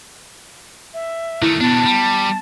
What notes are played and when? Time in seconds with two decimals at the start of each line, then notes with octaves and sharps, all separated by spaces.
0.94 E5
1.42 D#3 A3 E4
1.61 B2 B3 D4 A5
1.86 G3